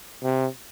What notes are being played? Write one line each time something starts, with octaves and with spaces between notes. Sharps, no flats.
C3